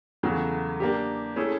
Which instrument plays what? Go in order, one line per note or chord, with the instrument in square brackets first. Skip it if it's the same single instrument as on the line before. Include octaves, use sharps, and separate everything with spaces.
[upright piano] E2 C#3 F#3 A3
A#3 D4 G4
A3 C#4 E4 G#4